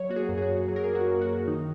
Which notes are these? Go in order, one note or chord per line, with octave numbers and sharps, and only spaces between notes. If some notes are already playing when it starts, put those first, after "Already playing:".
Already playing: F#3 C#5
A#3 F#4
G#4
F#2
G#4
F#4
F#2
F#3 G#4
A#4
G#4
A#3
F#4
F#2
F#4
F#2
D#3 D#4